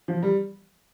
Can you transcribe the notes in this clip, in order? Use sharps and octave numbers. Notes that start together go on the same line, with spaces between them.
F3
G3